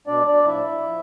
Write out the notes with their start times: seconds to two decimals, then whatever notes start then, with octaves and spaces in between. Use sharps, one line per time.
0.07 B2 D4 D5
0.27 D4 D5
0.47 A2 F3 E4 E5
0.87 F3